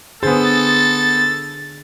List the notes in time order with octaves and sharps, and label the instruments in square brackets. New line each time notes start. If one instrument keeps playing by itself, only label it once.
[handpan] D3 D4 G#4 [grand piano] B3 C5 [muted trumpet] A4 [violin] A6